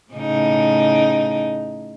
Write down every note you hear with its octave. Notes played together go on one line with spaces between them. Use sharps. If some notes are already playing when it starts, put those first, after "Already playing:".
A2 C#3 D#4